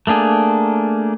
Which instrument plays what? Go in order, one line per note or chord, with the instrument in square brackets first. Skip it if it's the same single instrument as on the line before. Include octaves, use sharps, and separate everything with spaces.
[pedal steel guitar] A3 A#3 D4 G#4